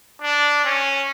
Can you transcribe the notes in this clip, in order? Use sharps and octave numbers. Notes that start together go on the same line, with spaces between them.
D4
C#4